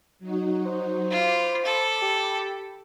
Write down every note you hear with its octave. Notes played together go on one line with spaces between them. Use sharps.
F#3 D#4 F#4
C5
F4 B5 D6
A4
G4